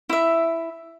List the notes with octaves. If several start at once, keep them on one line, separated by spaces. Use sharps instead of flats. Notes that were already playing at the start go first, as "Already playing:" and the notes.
E4 E5